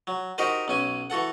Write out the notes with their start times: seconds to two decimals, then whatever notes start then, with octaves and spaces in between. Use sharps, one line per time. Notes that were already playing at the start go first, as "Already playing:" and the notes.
0.07 F#3
0.38 D#4 F#4 G4 A#4 C5 D#5
0.68 B1 C#4 G#5
1.10 E3 F#4 A4 F#5